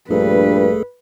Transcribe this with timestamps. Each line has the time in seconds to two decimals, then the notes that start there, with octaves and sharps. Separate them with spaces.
0.10 A#1 G2 A3 G#4 A4 B4